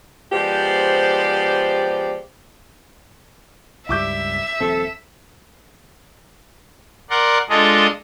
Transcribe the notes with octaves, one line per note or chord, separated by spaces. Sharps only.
F3 G#3 B3 G4 C5 D5
C#2 G2 G3 E4 E5 D6 G6
D#1 F3 C4 A4
A#4 D5 F#5 C6
G#3 D4 F4 G#4 A4 D#5